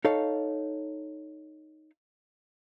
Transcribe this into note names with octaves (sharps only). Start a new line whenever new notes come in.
D#4 A4 C#5 F5